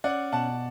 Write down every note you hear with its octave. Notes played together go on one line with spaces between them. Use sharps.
C#4 D5 F#5
B2 F#5 A5